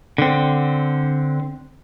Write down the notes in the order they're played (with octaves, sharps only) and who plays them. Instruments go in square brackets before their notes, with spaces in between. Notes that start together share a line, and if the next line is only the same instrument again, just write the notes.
[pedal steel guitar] D3 C4